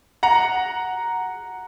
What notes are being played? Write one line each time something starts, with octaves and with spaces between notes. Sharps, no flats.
F#5 A#5